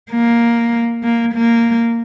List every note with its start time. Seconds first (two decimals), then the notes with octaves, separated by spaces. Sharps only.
0.11 A#3
1.03 A#3
1.34 A#3